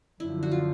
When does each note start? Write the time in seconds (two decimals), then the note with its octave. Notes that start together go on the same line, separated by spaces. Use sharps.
0.20 F#2 D3 F3 E4
0.43 F#4
0.51 F4